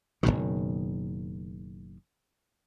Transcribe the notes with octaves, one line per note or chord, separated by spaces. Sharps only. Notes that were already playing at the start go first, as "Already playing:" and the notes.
F#1 C#2 B2 D#3